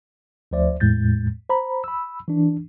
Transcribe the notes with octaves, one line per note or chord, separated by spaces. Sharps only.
D2 F3 C5 D5 E5
E2 A2 G#3 G6 A6
C5 A#5 B5
B5 E6
E3 D4